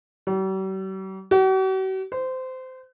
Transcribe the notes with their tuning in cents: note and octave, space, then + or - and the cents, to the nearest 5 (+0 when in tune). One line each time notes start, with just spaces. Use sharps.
G3 -45
F#4 +45
C5 -20